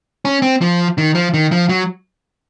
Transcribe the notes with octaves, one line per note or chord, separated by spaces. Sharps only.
C#4
C4
F3
D#3
F3
D#3
F3
F#3